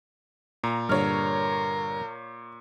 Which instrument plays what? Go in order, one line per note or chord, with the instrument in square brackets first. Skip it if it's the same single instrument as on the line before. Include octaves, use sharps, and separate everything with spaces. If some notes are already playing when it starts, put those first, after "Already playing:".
[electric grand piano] A#2 [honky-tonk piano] A#5
[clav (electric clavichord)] G2 D3 [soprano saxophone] A#4 [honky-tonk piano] C#5 F6